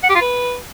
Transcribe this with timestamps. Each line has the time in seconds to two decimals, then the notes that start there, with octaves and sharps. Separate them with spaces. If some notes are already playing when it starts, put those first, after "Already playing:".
0.03 F#5
0.09 G4
0.15 F4
0.21 B4